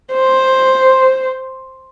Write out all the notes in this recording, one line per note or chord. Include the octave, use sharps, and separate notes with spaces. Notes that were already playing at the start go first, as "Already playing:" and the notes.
C5